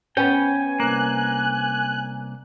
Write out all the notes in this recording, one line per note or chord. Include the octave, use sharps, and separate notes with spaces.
B3 C#4 G5 G#5
C2 A#3 F#6